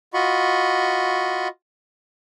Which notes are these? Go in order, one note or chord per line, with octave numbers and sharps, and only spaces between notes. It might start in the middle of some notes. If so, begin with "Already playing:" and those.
F4 F#4 D#5 B5 C#6